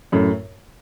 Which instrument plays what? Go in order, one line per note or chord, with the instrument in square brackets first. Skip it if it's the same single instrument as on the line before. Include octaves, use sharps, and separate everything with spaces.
[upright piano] F#2 A2